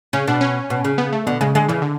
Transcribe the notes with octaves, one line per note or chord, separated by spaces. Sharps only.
C#3 C#4
B2 D4
C#4
B2
C#3
B3
A3
B2 D3
C#3 G#3
D3 G#3
C#3 E3
D3